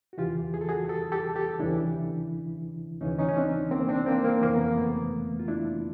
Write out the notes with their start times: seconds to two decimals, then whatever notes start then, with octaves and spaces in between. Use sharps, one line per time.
0.13 F#4
0.18 E2 C#3 E3 F4 G4
0.54 G#4
0.61 A4
0.69 F#4 G#4
0.89 G4 A4
1.12 G4 A4
1.36 G4 A4
1.59 D#2 C#3 E3 D4 E4
3.01 D2 C#3 E3 C#4 D#4
3.18 C#4 D#4
3.28 C#4
3.37 C4 D4
3.71 A#3 C4
3.89 C4 D4
4.06 A#3 C4
4.24 A#3
4.42 F2 C#3 E3 A#3
4.54 B3
4.64 A#3
4.77 A3 B3
5.39 F4
5.48 D4 E4